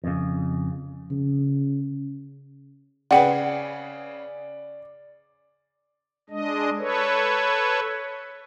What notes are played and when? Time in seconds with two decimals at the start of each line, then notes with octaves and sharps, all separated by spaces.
0.04 F2 C#3
1.11 C#3
3.11 C#3 G#4 B4 D5 F#5 G5 C#7
6.30 G#3 D4 D#5
6.78 A4 B4 C#5